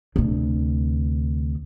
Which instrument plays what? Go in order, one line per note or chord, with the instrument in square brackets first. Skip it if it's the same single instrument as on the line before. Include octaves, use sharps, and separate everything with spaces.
[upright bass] D2 C3